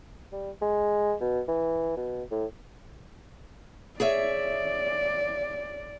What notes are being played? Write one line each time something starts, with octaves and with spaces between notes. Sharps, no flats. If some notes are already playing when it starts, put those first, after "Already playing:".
G3
G#3
B2
E3
B2
A2
G#4 C#5 D5 E5